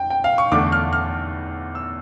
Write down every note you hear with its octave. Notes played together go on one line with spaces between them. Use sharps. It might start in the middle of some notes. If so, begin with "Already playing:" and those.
Already playing: F2 G5
G5
F5
C#6
E2 D3 A3 D4 D6
F6
F6
E6